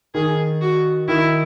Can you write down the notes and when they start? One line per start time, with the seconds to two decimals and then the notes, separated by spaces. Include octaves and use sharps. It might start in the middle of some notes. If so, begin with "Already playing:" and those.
0.14 D#3 G#4
0.61 F#4
1.08 D#3 E4